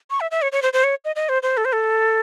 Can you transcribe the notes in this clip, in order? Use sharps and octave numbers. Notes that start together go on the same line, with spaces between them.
C#6
E5
E5
C#5
C#5
C5
C5
C#5
D#5
D#5
C5
C5
A4
C5
A4